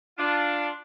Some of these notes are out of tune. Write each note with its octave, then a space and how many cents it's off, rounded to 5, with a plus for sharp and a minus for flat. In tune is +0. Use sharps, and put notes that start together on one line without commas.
D4 +0 F4 +0